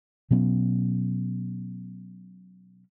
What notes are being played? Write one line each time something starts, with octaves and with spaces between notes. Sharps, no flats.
B2 F#3 B3 C#4